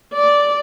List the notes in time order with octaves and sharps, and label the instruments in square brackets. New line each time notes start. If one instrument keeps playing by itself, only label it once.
[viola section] D5